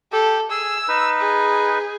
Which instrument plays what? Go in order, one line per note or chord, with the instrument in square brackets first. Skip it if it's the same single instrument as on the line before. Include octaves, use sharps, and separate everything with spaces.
[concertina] G4 [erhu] A4
[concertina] G#4 G#5 [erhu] E6
[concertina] D#4 B4
[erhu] G#4